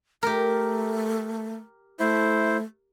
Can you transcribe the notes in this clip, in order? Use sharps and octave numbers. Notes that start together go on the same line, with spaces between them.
A3 G4 A#4
A3 E4 C5